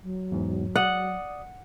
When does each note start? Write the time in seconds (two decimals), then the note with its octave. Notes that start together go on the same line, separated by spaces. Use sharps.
0.02 F#3
0.32 E2 G#2
0.76 D5 F#5 D#6